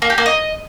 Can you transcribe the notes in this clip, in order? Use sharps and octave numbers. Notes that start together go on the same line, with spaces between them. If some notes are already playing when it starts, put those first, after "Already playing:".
A#3
G4
A#3
D#5